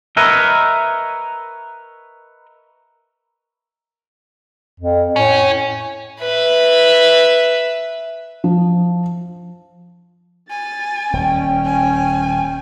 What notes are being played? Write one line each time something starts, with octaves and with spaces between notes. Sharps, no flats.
A#4 B4 C#5 D#5 E5
F2
A2 C#4
B4 E5
F3
G#5 A6
D#1 C#4 G5
G#5